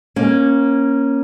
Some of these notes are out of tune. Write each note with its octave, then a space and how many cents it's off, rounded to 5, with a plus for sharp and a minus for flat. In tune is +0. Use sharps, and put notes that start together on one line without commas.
A#3 +15 C#4 -10